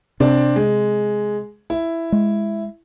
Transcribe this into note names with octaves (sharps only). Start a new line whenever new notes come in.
C3 C4 D4 D5
G#3
E4
G#3